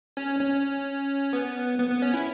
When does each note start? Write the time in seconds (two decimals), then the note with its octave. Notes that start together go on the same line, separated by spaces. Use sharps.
0.17 C#4
0.40 C#4
1.33 B3
1.79 B3
1.90 B3
2.02 C#4
2.14 E4